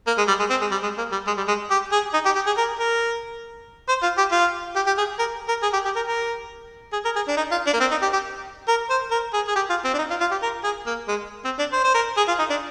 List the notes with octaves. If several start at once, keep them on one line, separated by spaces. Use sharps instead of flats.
A#3
G#3
G3
G#3
C4
G#3
G3
G#3
A#3
G3
G#3
G3
G#3
G4
G#4
D#4
G4
G4
G#4
A#4
A#4
C5
F4
G4
F4
G4
G4
G#4
A#4
A#4
G#4
G4
G4
A#4
A#4
G#4
A#4
G#4
D4
D#4
F4
D4
A#3
C4
D#4
G4
G4
A#4
C5
A#4
G#4
G#4
G4
F4
C4
D4
D#4
F4
F4
G4
A#4
G#4
A#3
G#3
C4
D4
C5
C5
A#4
G#4
F4
D#4
D4